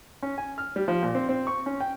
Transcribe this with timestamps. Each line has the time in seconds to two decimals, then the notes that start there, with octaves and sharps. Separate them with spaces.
0.23 C#4
0.38 G#5
0.58 F6
0.76 G3
0.88 F3
1.03 A#2
1.15 C4
1.29 C4
1.47 C#6
1.66 C#4
1.80 G5